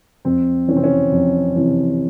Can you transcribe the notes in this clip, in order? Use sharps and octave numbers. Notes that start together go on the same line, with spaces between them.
F2 C4
C3 E3 C4 C#4
C#4
F2
C3 E3